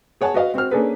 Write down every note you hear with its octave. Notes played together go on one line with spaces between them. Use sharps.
G#4 C#5 F#5 G#5 A5
F#4 B4 D#5 F5
C4 F#4 C5 F6
A#3 C#4 D4 G#4 A4 B4